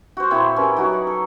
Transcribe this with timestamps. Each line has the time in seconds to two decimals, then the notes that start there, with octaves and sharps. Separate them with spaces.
0.17 F#4 C5
0.31 A#2 C4 E4 F#5
0.56 C#4 G4 A#4 B4
0.76 F#3 D#4 F#4
0.92 F#5
1.07 A4